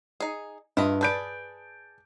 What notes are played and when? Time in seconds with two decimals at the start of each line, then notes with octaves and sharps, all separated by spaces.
0.20 D#4 G#4
0.77 G2 E4 F4 D#5
1.01 G#4 B4 D5 A5 G6 D7